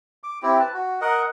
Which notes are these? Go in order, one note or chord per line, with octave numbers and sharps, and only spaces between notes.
D6
C4 E4 G4
B4 A5
F#4
A#4 D#5 F#5